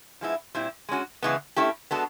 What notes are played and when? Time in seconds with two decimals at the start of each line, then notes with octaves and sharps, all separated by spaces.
0.21 F3 G#3 B3 E4
0.55 A#2 G3 C4 E4
0.89 G#3 C#4 F#4
1.22 C#3 E3 G#3 B3
1.56 A3 C#4 E4 G4
1.91 G#3 B3 D4 F#4 A4